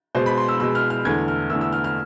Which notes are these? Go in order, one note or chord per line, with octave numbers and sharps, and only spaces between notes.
B2 G#3 C5
B5
C6
E6
B2 G#3 E6
F6
F6
E2 D3 A3 G#6
F6
E2 D3 A3 E6
E6
F6
F6